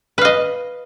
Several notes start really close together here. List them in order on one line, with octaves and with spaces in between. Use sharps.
B4 F5 D#5